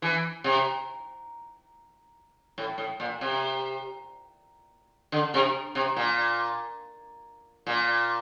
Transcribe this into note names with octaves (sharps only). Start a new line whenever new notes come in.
E3
C3
A2
A2
A#2
C3
D3
C3
C3
A#2
A#2